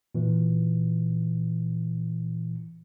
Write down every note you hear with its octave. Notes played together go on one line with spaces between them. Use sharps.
A#2 E3